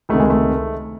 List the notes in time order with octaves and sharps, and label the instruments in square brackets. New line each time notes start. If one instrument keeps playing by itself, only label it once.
[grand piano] C#2 C3 D#3 A3
G#3
A3